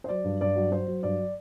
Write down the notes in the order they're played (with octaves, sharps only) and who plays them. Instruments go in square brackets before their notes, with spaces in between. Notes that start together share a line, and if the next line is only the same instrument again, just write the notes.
[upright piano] C5
F#3 D5
G2
G2 D5
F#3
F#3 C5
F#3
G2 D5